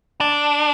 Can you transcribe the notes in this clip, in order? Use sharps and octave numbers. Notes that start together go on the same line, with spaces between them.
D4